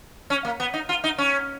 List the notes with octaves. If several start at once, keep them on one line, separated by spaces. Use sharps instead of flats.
C#4
A#3
B3
D#4
F4
D#4
C#4